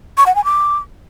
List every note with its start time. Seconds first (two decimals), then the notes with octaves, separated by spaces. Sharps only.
0.17 C#6
0.26 F#5
0.35 G#5
0.44 D6